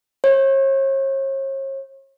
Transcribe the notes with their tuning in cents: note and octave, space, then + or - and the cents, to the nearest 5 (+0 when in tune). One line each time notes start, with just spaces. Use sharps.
C#5 -45